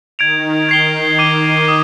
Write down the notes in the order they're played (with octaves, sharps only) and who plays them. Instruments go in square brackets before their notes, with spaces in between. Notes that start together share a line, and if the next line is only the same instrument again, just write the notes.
[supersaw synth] D#3 [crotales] G#6 D7 F7
[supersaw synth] D#3 [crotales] G#6 C7 G7
[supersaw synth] D#3 [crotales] D6 G#6 D#7 G7
[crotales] D#6